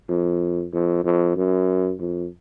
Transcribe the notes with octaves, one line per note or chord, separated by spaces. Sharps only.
F2
F2
F2
F#2
F2